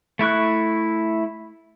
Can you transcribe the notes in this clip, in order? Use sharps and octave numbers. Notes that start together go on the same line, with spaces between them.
A3 E4 C#6 F#6